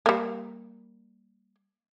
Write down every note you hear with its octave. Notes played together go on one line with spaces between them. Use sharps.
G3 A#3